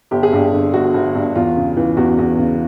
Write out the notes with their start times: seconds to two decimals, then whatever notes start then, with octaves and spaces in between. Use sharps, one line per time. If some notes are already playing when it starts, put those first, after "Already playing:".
0.11 G1 G4
0.23 G#4
0.33 G2 G4
0.53 D3
0.74 G1 F#4
0.94 G1
1.15 G2
1.35 E2 F4
1.57 C#3
1.77 E3
1.97 E2 F#4
2.18 E2
2.38 C#3